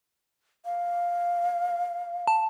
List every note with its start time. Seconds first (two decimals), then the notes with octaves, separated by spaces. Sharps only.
0.65 F5
2.27 A5